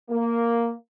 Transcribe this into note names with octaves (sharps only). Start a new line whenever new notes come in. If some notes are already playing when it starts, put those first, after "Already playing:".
A#3